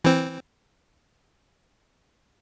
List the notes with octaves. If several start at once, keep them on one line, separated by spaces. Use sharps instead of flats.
E3 C4